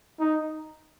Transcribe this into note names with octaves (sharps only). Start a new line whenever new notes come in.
D#4